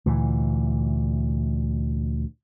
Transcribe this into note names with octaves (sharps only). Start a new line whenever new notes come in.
D2 A#2 E3